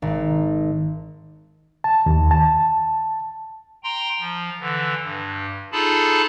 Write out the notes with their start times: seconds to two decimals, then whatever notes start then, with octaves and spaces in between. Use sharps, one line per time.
0.02 G#1
1.84 A5
2.06 D#2
2.31 A5
3.83 G5 A#5 C6
4.20 F3
4.60 D3 E3
5.03 G2
5.72 D#4 F4 G#4 A4 A5 B5